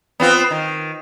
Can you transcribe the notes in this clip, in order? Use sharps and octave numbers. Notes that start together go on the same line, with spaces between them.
B3 C4 F4
D#3